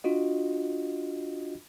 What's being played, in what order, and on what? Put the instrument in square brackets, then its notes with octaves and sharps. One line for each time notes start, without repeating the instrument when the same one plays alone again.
[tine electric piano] D4 F4 F#4 D#5